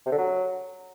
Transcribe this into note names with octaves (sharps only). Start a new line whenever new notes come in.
C3
D3
F#3